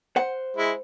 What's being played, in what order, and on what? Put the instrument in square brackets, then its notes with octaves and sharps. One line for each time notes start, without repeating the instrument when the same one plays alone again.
[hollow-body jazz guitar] C5 F#5
[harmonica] G#3 E4